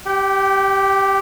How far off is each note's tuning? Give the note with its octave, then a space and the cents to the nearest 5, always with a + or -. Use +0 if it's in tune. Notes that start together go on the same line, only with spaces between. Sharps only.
G4 +0 G5 -35